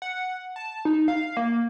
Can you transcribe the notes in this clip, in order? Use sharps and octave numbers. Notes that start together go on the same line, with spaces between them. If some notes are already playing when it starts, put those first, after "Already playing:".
F#5
A5
D#4
F5
A#3